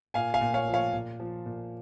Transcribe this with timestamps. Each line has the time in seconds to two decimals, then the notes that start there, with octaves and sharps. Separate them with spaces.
0.14 A#2 F5 G#5
0.34 F5 G#5
0.41 A#2
0.54 C#5 F5
0.68 F3
0.74 C#5 F5
0.93 A#2
1.20 F3
1.46 A#2